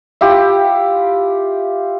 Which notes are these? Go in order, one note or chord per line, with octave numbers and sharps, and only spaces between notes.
E4 F4 G4